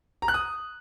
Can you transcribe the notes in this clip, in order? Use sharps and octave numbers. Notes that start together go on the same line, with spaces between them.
A#5
F#6
D#6